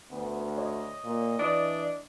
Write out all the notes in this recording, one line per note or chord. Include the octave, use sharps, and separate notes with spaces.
D2 B3
C#5 D#5
A#2
E3 D4 D5 D#6